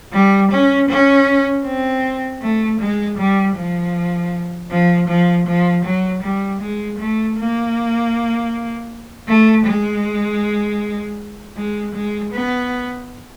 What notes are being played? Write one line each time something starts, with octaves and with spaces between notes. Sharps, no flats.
G3
C#4
C#4
C4
A3
G#3
G3
F3
F3
F3
F3
F#3
G3
G#3
A3
A#3
A3
G#3
G#3
G#3
B3